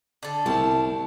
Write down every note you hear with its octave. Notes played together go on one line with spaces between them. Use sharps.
D3 A4
C2 A5